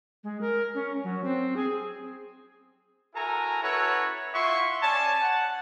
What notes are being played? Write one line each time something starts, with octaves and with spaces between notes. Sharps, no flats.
G#3
A#4
C#4
F#3
C4
G#4
E4 F#4 A4 A#4 G#5 A#5
C#4 E4 F#4 A4 B4 C#5
E4 F4 E5 F#5 C6 C#6
C#4 C#5 D5 G#5 A5
F#5